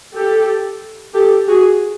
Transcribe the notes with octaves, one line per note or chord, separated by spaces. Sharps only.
G4 A4
G4 A4
F#4 G#4